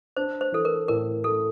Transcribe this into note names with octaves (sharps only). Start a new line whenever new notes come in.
D4 C5
C5
E3 A4
A#4
A2 A#4
A3 A4